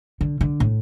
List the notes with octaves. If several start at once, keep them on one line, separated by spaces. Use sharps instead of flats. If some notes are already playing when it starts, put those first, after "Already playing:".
D3
D3
A2